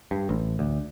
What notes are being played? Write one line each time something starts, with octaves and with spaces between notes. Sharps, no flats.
G2
A1
D2